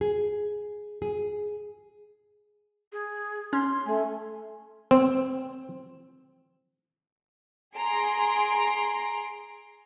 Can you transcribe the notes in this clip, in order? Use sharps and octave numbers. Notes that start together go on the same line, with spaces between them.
G#4
G#4
G#4
C#4 C6
A3 G#5
C4
G#4 A#5 C6 D7